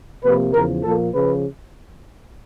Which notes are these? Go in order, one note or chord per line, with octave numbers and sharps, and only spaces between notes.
C3 F3 A#3 B4
E2 C#3 F3 A#4
A#2 F3 A#3 A4
C#3 F3 B4